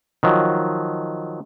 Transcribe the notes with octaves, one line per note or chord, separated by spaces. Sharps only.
D#3 F3 F#3